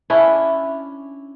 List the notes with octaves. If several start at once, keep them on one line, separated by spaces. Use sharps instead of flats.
C#4 D4 E4